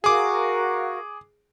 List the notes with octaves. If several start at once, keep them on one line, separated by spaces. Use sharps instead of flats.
F#4 G#4 A#4 F5 D6